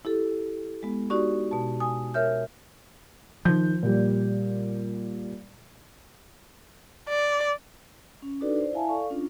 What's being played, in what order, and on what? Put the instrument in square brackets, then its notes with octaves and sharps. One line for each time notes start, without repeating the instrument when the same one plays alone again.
[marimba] E4 G4 A4
G#3 B3
D#4 F#4 G4 D5 C#6
B2 A5
G#5 D#6
A#4 C#5 E5 F6 G6
[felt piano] D#3 G6 [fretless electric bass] F3
[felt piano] A#2 G3
[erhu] D5
[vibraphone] C#4
D4 D#4 F#4 A4 B4 D5
C5 D5
E4 E5 F5 G#5 A5
A4 D5 F5 C#6
C#4 D4 F4